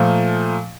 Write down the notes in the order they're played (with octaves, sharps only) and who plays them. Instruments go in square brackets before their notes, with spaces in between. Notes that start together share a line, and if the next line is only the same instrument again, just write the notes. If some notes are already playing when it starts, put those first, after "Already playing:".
Already playing: [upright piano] A#2 F3 A3